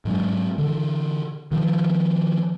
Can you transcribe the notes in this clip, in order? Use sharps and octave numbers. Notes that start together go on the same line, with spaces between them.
G#2 F#3 G#3
D3 E3
D#3 F3 G3